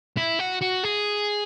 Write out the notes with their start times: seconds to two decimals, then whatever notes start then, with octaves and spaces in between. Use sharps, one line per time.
0.17 E4
0.39 F#4
0.62 F#4
0.84 G#4